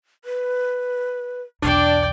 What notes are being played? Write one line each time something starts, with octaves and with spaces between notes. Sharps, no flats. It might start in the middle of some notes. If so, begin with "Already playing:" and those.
B4
B1 E2 D4 D5 G5